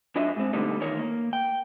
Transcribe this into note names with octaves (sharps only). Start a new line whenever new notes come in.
F#2 D4 F#4 D#5 E5
G#2 C4
B2 D3 G3 A3 D#4
D#3 E3 D#4 A#4 C#5
A#3
G5